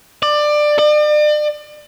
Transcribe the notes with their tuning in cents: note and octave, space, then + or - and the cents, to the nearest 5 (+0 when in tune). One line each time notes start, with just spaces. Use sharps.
D5 +20
D5 +40